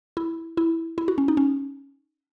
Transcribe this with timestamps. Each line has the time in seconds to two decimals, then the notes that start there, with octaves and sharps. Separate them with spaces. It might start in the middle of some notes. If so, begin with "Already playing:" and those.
0.17 E4
0.57 E4
0.98 E4
1.08 F#4
1.18 C#4
1.28 D#4
1.37 C#4